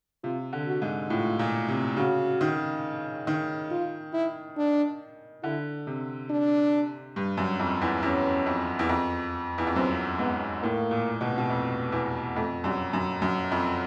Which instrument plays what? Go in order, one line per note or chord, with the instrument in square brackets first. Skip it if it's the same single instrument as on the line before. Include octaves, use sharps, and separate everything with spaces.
[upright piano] C3 [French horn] F4
[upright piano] D3
[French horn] F#4
[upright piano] G#2
[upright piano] A2 [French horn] F4
[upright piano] A#2
C3
[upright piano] C#3 [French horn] F#4
[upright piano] D#3
D#3
[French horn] F4
E4
D4
[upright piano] D3 [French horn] E4
[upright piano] C3
[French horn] D4
[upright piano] G2
F#2
F2
E2
[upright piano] E2 [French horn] C#4
[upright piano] F2
E2
F2
E2
F2
[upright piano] F#2 [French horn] C4
[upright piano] G#2 [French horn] B3
[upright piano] A2 [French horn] A#3
[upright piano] A#2
B2
C3
B2
F2
E2
[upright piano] F2 [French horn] A3
[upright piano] F#2 [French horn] G3
[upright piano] F#2
F#2
F2